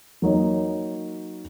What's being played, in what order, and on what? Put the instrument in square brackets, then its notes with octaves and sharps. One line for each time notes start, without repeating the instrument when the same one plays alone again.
[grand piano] F#3 A#3 D#4 A#4 C#5